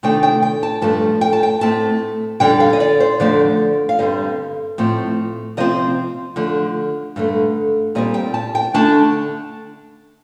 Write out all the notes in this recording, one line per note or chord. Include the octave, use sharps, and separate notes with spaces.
C3 D#3 A3 D4 G5
G5
G5
A5
G2 F3 A3 D4 A5
G5
A5
G5
A2 A3 C4 A5
F2 D3 G3 D4 G5
F5
D#5
D5
C5
F2 D3 F3 A3 D4 D5
F5
G2 D3 G3 C4 D#5
A2 F3 C4
C3 F3 C4 D#5
D3 F3 A3
G2 D3 A3
A#2 G3 C4 D#5
G5
A5
G5
D3 A3 D4 A5